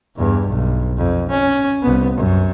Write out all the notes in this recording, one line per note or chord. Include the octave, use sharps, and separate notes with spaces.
E2 G2
B1
F2
C#4
C2 B3
F#2